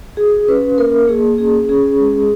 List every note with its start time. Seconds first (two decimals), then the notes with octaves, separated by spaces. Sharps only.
0.17 F#4 G#4
0.48 C#4 B4
0.78 A#3 A#4
1.08 A#3 G#4
1.38 C#4 G#4
1.69 C#4 G#4
2.00 G#3